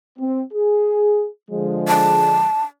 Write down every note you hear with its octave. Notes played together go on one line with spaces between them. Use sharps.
C4
G#4
D3 F3 G#3
A5